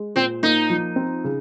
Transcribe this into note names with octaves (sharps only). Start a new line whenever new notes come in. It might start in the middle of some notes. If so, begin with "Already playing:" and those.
Already playing: G#3
A#2 C4
A#3 D#4
F3
C4
C#3